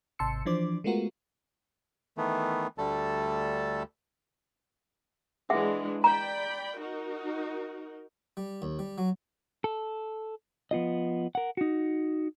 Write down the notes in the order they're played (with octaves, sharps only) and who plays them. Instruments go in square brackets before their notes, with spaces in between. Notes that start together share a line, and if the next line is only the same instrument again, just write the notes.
[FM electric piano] G#1 C3 A5 C6 E6 C#7
E3 F3 D4 C5 D6
G#3 A3 B3 F4 F#4 A#4
[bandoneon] D#3 E3 A3 B3
D2 D3 G3 A3 A4 A5
[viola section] E3 G#3 D4 [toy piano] G#4 E5 F#5
[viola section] D5 G5 B5 [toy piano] A#5
[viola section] D#4 F#4 A#4
[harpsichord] G3
D#2
G3
F#3
[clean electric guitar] A4
F3 B3 F4 D#5
A#4 F#5
D#4 F#4